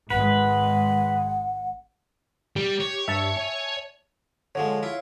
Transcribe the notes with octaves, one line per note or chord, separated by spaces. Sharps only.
G#1 G#3 B4 F#5
G3 G4
C#5
G2 E5 A5
G#5
D3 F3 G#3 C#5
E4 F4